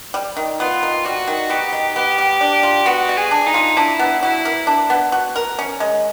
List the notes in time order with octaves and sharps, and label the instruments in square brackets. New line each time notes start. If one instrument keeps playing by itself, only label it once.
[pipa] G3
D#3
[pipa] B3 [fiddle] F4
[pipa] D#3
[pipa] G3 [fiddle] F#4
[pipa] D#3
[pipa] B3 [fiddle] G4
[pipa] D#3
[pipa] B3 [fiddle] G4
[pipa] G3
D4
F4
[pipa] B3 [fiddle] F#4
[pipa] G3
[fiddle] G#4
[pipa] D4
[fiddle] D#4
[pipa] F4
[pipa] D4 [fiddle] E4
[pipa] B3
[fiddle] E4 [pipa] F#4
[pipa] A#4
D4
B3
F#4
A#4
C#4
G#3